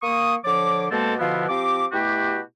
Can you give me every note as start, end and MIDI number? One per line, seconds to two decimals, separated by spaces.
0.02 0.35 58
0.02 0.35 85
0.02 0.35 87
0.45 0.86 50
0.45 0.86 53
0.45 0.86 73
0.45 0.86 86
0.91 1.14 47
0.91 1.14 56
0.91 1.14 58
0.91 1.14 60
0.91 1.14 69
1.19 1.47 47
1.19 1.47 50
1.19 1.47 53
1.19 1.47 59
1.19 1.47 64
1.19 1.47 65
1.49 1.85 53
1.49 1.85 60
1.49 1.85 67
1.49 1.85 86
1.92 2.40 47
1.92 2.40 57
1.92 2.40 64
1.92 2.40 66
1.92 2.40 67